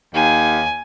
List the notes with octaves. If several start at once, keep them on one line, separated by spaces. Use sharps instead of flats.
D#2 G#5